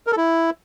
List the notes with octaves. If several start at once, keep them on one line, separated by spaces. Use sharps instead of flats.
A#4
A4
E4